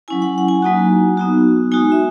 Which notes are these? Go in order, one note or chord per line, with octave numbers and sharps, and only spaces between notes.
F#3 C#4 E4 G#5
F#5
F#5
G#5
F#3 A#3 D#4 F#4
B3 D#4 F#4
G#3 D#4 F#4 G#5
E5